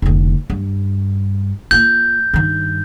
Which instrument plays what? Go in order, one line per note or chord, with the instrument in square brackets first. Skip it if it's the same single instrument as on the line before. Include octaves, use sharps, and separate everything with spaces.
[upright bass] F1 D2
G2
[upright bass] A#3 F4 [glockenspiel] G6
[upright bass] G2 D#3